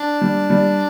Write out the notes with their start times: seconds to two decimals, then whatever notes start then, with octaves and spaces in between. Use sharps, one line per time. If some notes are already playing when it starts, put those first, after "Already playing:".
Already playing: D4
0.21 G3
0.50 G3